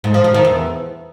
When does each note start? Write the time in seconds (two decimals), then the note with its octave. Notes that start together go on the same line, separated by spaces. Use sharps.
0.04 G#2
0.14 F3
0.24 F3
0.34 D#3
0.45 E2